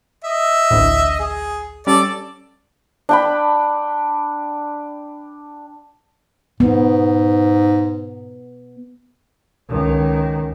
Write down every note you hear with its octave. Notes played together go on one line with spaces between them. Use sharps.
D#5 E5
A1 D2 A2
G#4
G3 C#4 A4 D5
D4 G5 B5
G#2 B3
C#2 D#3